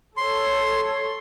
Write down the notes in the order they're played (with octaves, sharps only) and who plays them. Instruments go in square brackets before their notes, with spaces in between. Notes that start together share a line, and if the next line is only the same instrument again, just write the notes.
[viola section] A4 C#5 [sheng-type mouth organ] C6